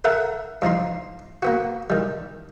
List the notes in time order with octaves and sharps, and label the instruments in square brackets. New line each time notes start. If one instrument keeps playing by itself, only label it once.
[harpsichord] A4 A#4 E5 F#5
G2 F3 D#4 C6
A#3 B3 F#4
D#3 G3